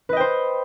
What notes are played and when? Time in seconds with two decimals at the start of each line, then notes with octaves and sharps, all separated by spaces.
0.09 B4
0.13 D#5
0.16 G5
0.20 C5